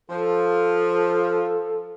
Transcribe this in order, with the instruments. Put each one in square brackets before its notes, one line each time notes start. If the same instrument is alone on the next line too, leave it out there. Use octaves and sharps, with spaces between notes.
[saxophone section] F3 [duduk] A4